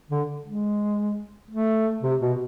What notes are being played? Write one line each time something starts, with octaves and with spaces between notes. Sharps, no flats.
D3
G#3
A3
C3
B2